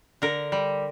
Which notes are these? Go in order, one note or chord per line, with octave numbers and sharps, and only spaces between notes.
D3 A#4
G3